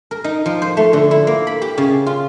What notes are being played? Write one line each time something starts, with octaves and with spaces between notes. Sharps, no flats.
A#4
D#4
F3
C5
A3
D3
E4
A#3
B5
G4
C#3
F4